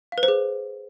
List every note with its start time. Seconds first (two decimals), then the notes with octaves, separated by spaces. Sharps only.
0.12 F5
0.18 B4
0.23 C5
0.28 G#4